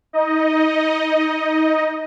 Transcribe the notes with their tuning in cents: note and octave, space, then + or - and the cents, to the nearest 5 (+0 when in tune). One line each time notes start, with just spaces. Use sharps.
D#4 +25 D#5 +0